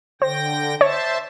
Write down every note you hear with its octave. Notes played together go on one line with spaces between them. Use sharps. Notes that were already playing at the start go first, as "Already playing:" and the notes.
D3 C5 G5 A#6
C5 C#5 E5 A5